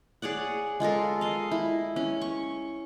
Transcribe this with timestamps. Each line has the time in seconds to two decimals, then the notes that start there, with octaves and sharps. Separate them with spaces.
0.22 G#4 C#5 D5 F#5
0.80 G#3 F4 A4 A#4
1.21 D#5 F5
1.51 E4
1.96 C#4
2.21 C#6